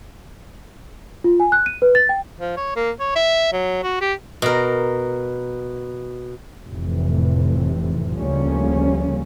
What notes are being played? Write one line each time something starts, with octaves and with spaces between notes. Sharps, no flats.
F4
G#5
F#6
D#7
B4
A6
G5
F3
C#5
A#3
C#5
E5
F#3
F#4
G4
B2 A#4
F1 A2 C3 E3
D2 C#3 F3 G3 A#3 C#4